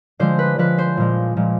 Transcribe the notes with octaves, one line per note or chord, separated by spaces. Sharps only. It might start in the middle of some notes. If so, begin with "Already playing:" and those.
D3 F3 G#3 C5
B4
D3 F3 G#3 B4
C5
A#2 F3 G#3
A#2 F3 G#3